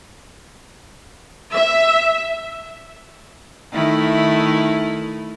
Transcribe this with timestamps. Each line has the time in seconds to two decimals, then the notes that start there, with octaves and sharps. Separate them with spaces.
1.53 E5
3.72 D#3 A3 E4